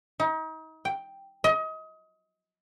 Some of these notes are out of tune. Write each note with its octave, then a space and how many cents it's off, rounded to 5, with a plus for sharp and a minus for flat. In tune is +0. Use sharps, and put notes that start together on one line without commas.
D#4 +35
G5 +0
D#5 +30